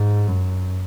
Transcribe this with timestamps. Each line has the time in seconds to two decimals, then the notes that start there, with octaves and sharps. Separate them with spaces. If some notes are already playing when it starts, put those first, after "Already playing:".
Already playing: G#2
0.27 F#2